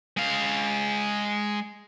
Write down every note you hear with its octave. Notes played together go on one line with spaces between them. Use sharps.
G#3 F5